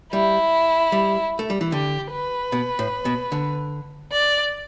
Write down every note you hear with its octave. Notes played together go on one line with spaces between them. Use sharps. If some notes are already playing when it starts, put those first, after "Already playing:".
G3 E4
G3
A3
G3
E3
D3 G4
B4
B2
A2
B2
D3
D5